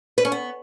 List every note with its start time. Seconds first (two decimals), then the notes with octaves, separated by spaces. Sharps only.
0.18 B4
0.25 C#4
0.32 B3